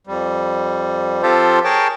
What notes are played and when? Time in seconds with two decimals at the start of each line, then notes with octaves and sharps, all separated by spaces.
0.07 F2 G3
1.23 F3 C4 F4 G4 A4 C5
1.64 G#4 A#4 C#5 G5 A5